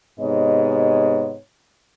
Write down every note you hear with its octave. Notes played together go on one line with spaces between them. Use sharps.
G#2 C3 B3 C#5 D#5